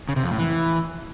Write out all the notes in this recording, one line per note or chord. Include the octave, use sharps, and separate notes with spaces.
C#3
C3
F2
A2
E3